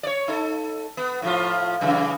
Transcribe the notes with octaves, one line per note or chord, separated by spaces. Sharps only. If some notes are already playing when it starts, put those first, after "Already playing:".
C#5 D5
D#4 A4
B3
A2 F3 F4
F#2 C#3 E3